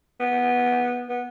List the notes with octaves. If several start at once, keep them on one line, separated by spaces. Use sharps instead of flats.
B3
B3